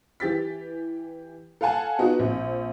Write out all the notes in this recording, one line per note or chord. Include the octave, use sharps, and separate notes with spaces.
E3 G4 A6 B6
A4 F5 F#5 G#5 A5
B3 D#4 F4 F#4
A#1 C4